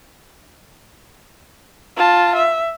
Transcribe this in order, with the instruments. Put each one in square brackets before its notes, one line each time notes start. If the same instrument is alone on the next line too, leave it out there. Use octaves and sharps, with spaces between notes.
[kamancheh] F4 A5
E5